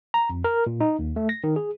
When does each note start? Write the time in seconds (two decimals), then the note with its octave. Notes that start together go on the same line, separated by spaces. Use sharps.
0.14 A#5
0.30 F2
0.44 A#4
0.67 A#2
0.81 D#4
0.99 D#2
1.16 A3
1.29 A#6
1.44 D#3
1.56 G#4